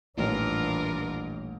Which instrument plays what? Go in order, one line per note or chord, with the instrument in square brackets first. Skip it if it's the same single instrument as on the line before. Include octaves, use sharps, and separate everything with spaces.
[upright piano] D#1 A1 [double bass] E3 D4 [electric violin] F4 A#4